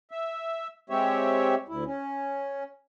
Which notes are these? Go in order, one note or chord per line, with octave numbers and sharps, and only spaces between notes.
E5
G#3 C4 G4 C#5 E5
D2 E4
C#4